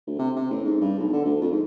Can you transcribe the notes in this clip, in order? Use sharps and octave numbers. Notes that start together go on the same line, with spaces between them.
D2
C3
C3
A1
G#2
G2
B1
D3
D2
F2
G#2